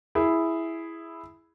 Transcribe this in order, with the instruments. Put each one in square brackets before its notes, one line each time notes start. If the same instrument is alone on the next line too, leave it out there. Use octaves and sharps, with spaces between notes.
[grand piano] E4 G#4